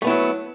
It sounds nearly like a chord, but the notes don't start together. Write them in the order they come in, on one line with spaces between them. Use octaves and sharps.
A3 B3 E4 F#3